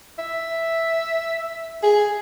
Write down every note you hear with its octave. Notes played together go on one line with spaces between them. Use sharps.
E5
G#4